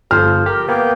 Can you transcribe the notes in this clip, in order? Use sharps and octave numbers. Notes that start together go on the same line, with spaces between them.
G1 F3 A4 C5 F6
G4 A#4
A#3 B3 G5